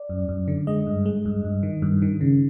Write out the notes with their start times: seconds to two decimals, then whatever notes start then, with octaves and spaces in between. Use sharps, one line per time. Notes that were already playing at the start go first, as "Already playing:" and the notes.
Already playing: D5
0.09 F#2
0.29 F#2
0.48 D3
0.67 G#3 D#5
0.87 G2
1.06 G#3
1.26 G2
1.45 G2
1.63 D#3
1.82 G2
2.02 D#3
2.21 C#3